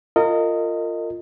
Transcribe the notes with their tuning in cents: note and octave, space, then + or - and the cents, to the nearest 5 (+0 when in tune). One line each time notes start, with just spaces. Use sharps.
F4 +0 A#4 -35 D#5 +0